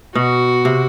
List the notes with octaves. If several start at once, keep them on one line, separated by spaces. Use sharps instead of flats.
B2 F#4
C3